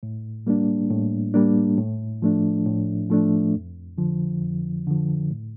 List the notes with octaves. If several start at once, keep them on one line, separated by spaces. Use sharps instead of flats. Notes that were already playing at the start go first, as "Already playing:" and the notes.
A2
G3 A#3 D4
A2
G3 A#3 D4
A2
F3 A3 D4
A2
F3 A3 D4
F2
D3 F3
F2
D3 F3
A2